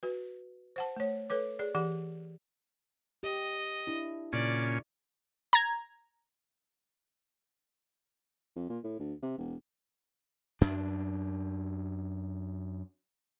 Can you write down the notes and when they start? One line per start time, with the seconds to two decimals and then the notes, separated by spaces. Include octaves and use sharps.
0.03 F#4 B4
0.76 C5 F#5 A5
0.96 A3 C#5
1.30 A4 B4 C#5 D6
1.59 G#4 D5
1.75 E3 G4 F#5
3.23 G4 D#5
3.87 D4 E4
4.33 A#2 C#3 C#4 D5
5.53 A#5 G#6
8.56 F2
8.69 A#2
8.84 A2
8.99 D2
9.22 C3
9.38 E1
10.61 F#2 D4